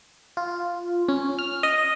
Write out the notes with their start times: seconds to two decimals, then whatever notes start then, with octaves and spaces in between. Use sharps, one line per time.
0.37 F4
1.09 C#4
1.39 F6
1.63 D#5